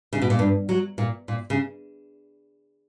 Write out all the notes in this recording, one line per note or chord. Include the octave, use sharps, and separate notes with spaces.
C#3
B2
A#2
G2
F#3
A#2
A#2
C#3